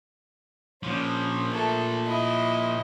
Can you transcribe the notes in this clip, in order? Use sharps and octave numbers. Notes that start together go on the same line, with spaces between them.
A#2 F3 C#4
A3 A4
E4 D#5